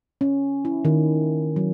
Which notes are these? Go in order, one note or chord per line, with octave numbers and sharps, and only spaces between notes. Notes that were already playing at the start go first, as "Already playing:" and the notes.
C#4
E4
D#3
F#3